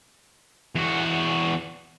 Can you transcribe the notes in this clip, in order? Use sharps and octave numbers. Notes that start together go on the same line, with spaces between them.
E2 F#4